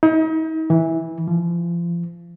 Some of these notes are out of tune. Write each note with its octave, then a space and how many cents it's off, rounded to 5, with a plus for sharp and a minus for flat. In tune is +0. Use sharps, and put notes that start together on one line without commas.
D#4 +40
E3 -15
F3 -35